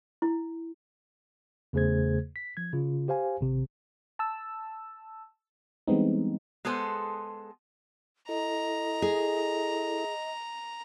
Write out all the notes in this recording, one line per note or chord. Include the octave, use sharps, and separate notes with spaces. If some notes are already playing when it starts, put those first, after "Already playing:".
E4
E2 C#3 A3 G#4 C5 G#6
B6
F3 G#6
C#3 F4
G4 C5 F5 G#5
G#1 C3
A5 E6
E3 G3 G#3 B3 C4 D#4
G#3 B3 G#4 A4 C5
E4 A4 D#5 A#5
G#4